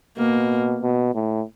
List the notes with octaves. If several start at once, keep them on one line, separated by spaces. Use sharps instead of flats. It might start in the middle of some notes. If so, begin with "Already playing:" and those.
B2 A#3
B2
A2